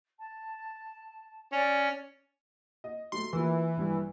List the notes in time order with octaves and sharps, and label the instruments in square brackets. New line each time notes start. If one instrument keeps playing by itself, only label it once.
[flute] A5
[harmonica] C#4 [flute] D5
[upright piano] D#5
[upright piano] F#3 A3 [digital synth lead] C6
[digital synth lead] E3 [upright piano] A#3 F4
[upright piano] A#1 G2 G3